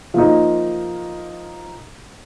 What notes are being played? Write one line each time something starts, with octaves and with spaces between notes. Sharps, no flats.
F3 A#3 D#4